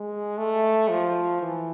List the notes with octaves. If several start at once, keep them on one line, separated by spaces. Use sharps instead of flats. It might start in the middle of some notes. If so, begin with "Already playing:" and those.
Already playing: G#3
A3
F3
E3